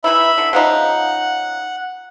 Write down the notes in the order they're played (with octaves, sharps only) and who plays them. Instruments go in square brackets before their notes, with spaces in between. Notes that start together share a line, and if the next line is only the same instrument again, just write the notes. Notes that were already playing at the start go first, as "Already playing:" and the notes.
[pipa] E3 D#4 E4 [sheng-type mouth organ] E5 B5
[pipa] D3
[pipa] C#3 F3 D#4 [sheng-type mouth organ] F#5